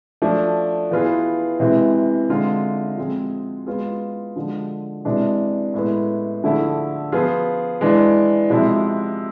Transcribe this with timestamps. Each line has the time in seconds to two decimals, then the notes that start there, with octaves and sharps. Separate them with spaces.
0.22 F3 A3 D4
0.91 E3 B3 F4 G#4
1.60 C3 E3 G#3
2.30 D3 G#3 C4 F4
2.98 F3 G#3 C4 G#4
3.66 G#3 B3 F4 G#4
4.36 D3 F3 G#3
5.05 C3 E3 G#3 D4
5.74 A2 G#3 B3
6.44 D3 F3 A3 E4 G#4
7.12 F3 B3 F4 G#4
7.81 E3 G#3 D4
8.50 C3 F3 G#3 C4 E4